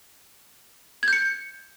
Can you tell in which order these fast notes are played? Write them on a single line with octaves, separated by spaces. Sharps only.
G#6 G6 C#7